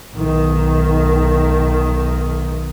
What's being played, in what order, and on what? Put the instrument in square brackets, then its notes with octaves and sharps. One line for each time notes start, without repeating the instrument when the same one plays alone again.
[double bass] B1 D#3